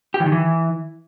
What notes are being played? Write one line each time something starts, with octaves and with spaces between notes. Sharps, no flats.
G4
E3
D#3
E3